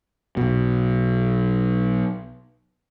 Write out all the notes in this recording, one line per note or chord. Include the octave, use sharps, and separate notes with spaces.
B1 B2